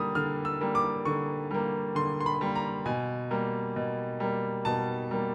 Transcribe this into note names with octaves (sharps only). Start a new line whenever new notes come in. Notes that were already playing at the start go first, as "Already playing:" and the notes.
Already playing: D3 G3 A#3 D#6
D3 F6
E6
G3 A#3
D6
D3 C#6
G3 A#3
D3 C6
C6
B5
G3 A#3
A#5
B2 G#5
G3 A#3
B2
G3 A#3
B2 A5
G3 A#3